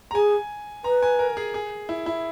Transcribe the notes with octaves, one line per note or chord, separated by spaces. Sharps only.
A#5
G#4 G#5
B4 A#5
G#5
A#4
G#4
G#4
E4
E4